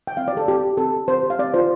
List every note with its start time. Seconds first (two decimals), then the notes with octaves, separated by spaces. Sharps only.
0.07 G5
0.17 C4 F5
0.28 D5
0.33 G4 A4
0.48 C4 G4
0.63 G4
0.77 C4 A4
0.93 G4
1.08 C4 C5
1.23 G4
1.30 F5
1.39 C4 D5
1.54 F4 C5